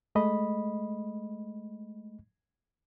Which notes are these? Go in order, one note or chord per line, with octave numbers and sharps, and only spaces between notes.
G#3 A3 D#5 B5